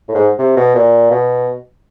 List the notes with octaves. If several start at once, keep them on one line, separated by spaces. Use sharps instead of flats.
A2
G#2
C3
B2
A#2
B2